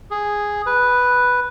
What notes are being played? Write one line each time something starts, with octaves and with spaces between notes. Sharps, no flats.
G#4
B4